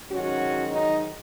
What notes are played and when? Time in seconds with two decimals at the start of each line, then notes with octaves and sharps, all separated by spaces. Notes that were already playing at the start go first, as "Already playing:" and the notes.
0.10 G#2 D#3 F#3 C#4 F#4
0.73 D#4